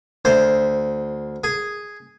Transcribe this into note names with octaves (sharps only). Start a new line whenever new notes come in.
D2 C5
G#4